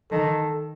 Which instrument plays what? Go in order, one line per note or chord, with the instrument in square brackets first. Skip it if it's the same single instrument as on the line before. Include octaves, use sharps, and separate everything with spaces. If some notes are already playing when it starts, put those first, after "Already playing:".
[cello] D#3 [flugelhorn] A4